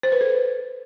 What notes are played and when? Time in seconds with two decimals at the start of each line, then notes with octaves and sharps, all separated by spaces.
0.03 C5
0.12 B4
0.21 A4